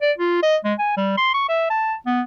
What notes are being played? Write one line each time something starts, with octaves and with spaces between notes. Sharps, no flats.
D5
F4
D#5
G#3
G#5
G3
C6
C#6
E5
A5
B3